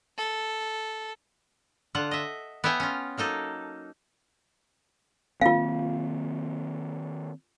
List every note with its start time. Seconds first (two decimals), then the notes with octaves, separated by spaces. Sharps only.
0.18 A4
1.95 D3 F4 F#5
2.11 D#5 E5
2.64 B3 C#5 E5 G5 G#5
2.80 C#4 F4
3.17 F#3 A#3 D#4 A4
5.42 D#3 A#3 C4 F4 F5